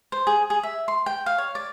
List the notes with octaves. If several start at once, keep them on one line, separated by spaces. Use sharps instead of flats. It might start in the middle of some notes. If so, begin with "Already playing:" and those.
C5
G#4
G#4
E5
C6
G5
F5
C#5
D5